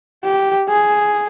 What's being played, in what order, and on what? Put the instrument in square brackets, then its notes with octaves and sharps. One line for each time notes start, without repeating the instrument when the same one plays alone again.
[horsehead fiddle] G4
G#4